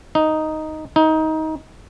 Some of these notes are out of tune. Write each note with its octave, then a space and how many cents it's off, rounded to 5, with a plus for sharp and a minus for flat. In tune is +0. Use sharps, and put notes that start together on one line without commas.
D#4 +0
D#4 +20